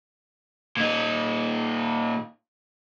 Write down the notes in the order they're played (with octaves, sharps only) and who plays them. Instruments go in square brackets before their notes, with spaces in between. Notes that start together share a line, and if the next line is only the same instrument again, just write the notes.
[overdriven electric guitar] A#2 D#4